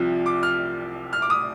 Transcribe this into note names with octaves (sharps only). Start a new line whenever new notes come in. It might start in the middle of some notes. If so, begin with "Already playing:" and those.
Already playing: C2 C3 F3
D6
F6
F6
D6
D#6